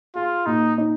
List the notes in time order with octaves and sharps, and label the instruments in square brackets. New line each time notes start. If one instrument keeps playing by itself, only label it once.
[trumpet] F4 [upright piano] G#4
[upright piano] A#2 [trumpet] D#4
[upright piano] D#4